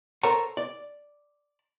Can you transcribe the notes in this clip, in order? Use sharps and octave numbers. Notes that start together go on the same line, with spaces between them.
A4 A#4 C5 C#5 F#5 A#5
D5